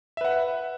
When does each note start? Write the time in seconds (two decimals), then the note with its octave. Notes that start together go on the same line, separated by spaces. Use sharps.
0.17 E5
0.21 B4
0.25 F#5